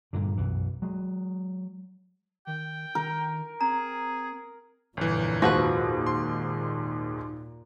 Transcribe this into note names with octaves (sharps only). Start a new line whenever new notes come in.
G2 A#2 D3
B1 F#2 E3
F#3 G#3
D#3 G5
D#3 A#4
C4 G#4 A#5
G1 F2 A#2 E3
D#2 G#2 F3 F#4 B4 A#6
A#2 C6